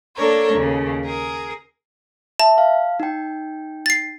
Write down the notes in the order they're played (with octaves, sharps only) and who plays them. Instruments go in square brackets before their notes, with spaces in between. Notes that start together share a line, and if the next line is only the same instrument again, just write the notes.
[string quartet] A#3 D4 A4 A#4 C#5
D#2 C#3
G#4 A#4
[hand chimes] E5 [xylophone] A5
[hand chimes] F5
D#4 G5
[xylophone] A6 C7